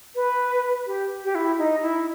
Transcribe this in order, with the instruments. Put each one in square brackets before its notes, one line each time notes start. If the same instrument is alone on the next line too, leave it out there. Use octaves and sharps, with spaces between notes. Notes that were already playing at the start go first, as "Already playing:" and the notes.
[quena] B4
G4
G4
E4
D#4
E4